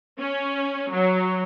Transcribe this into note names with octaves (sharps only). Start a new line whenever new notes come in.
C#4
F#3